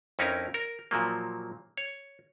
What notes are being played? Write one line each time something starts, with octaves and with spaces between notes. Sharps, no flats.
F2 C#4 D#4 E4 A#4
A#4
A#2 F3 F#3 A#3
C#5